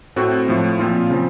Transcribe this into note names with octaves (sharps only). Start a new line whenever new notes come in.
A2 A3 C4 F#4
A2 F3 A3
A#2 F3 C4 F4
C#3 F3 C4